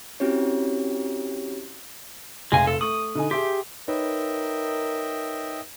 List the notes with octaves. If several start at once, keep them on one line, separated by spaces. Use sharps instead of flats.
C4 C#4 E4 F#4 G4 C#5
F1 G#3 F5 G#5
A4
A3 C#6 D#6 F#7
D3 D#4 G#5
G4 G#4 E5 C6
D#4 A#4 B4 C#5 D#5 E5 G5